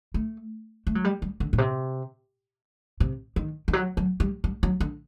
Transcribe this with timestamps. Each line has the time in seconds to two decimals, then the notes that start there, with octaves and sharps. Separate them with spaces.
0.14 A3
0.87 A3
0.95 F#3
1.05 G3
1.22 G3
1.40 D3
1.53 A#2
1.58 C3
3.00 C3
3.36 D#3
3.68 D#3
3.73 F#3
3.97 F#3
4.20 G3
4.44 G3
4.63 F#3
4.80 D3